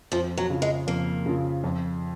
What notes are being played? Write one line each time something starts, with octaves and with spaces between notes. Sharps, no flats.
F2 F3
F#3
C#3 F3
G#3
F2 A#3
C#3 F3
F2